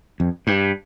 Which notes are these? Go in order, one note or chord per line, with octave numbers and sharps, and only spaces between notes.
F2
G2